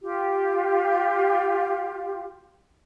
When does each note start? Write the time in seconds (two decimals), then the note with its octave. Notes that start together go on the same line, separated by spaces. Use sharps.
0.01 F4 G4